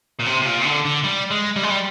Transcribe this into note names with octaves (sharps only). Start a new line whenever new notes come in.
A#2
C3
C3
A#2
C3
D3
D3
G3
G#3
G3
G#3
G3